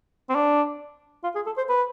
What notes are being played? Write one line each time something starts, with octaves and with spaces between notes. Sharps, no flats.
C4
D4
F4
G#4
A4
C5
B4